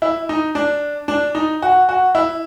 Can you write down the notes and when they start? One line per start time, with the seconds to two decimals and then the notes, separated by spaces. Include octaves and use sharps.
0.02 E4
0.29 D#4
0.55 D4
1.08 D4
1.35 D#4
1.62 F#4
1.89 F#4
2.15 E4